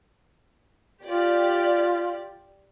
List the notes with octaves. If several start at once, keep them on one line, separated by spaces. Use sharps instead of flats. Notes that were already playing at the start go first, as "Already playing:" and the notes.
F4 G4 D5